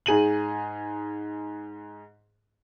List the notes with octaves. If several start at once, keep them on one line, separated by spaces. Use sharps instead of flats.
G#2 G#4 D#7 F#7